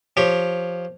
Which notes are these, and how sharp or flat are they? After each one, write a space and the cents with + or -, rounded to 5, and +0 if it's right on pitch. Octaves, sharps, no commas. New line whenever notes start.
F3 +0 G4 +5 C#5 +0